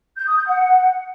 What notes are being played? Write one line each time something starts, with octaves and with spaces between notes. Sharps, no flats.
G6
D#6
G6
F#5